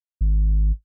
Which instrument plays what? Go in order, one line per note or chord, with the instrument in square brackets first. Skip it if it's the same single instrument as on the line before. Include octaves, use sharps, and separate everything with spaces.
[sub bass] G#1